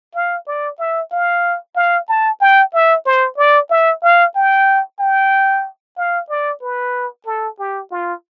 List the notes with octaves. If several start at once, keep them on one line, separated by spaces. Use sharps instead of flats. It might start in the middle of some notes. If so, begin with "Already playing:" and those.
F5
D5
E5
F5
F5
A5
G5
E5
C5
D5
E5
F5
G5
G5
F5
D5
B4
A4
G4
F4